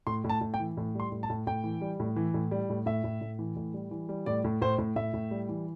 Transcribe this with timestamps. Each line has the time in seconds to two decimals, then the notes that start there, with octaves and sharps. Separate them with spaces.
0.07 A2 C6
0.24 A2
0.29 A5
0.41 A2
0.54 G5
0.60 E3
0.77 A2
0.95 G3 C6
1.12 A2
1.23 A5
1.30 A2
1.47 A2 G5
1.64 E3
1.81 G3
2.00 A2
2.16 E3
2.34 A2
2.51 G3
2.70 A2
2.86 A2 E5
3.04 A2
3.21 A2
3.39 E3
3.56 A2
3.74 G3
3.91 E3
4.09 G3
4.26 A2 D5
4.44 A2
4.62 A2 C5
4.78 A2
4.96 A2 E5
5.14 A2
5.31 G3
5.49 E3